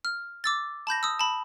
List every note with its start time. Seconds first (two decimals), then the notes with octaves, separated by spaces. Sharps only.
0.05 F6
0.44 D6 E6 A6
0.87 A5 B5 G6 A#6
1.03 D#6 E6
1.19 A5 B5